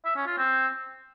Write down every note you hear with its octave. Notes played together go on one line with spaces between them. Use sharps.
E5
C#4
F4
C4